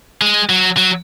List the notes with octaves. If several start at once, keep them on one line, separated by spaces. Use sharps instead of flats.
G#3
F#3
F#3